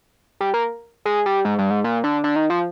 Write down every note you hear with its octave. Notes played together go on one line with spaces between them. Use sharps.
G3
A#3
G#3
G3
G#2
G2
G#2
A#2
D3
D3
D#3
F3